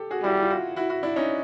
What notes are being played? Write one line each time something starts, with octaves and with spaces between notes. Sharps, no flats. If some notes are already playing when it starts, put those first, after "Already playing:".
Already playing: G4 A4
F#4 G#4
G3 E4 F#4
F4
E4 F#4
E4 F#4
E4 F#4
D4 E4
C#4 D#4